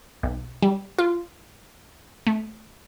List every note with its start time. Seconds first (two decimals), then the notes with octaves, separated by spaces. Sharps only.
0.23 B1
0.62 G3
0.98 F4
2.27 A3